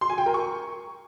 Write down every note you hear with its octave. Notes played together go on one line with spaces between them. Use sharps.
C6
G#5
G5
A#4
C#6